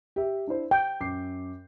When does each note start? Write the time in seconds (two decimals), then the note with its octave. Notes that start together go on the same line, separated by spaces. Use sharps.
0.16 G4 E5
0.47 D4 E4 C5
0.71 G5 G6
1.00 F#2 D6 C7